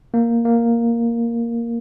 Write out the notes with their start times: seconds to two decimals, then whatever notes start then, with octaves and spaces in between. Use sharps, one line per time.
0.14 A#3
0.45 A#3